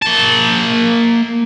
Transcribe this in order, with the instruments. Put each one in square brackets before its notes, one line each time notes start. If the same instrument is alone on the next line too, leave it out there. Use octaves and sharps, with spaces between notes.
[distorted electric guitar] A#3 A5